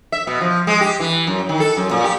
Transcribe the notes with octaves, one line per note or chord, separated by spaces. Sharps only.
E5
B2
F3
G#3
G4
E3
F#2
D#3
A4
F#2
A#2
G4